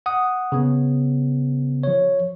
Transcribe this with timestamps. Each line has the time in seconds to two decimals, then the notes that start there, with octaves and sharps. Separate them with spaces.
0.06 F#5 D#6
0.52 C#3 B3
1.83 F3 C#5